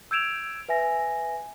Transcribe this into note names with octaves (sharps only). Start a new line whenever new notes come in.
E6 G6 G#6 D7 E7 F7
B4 E5 G#5 A#6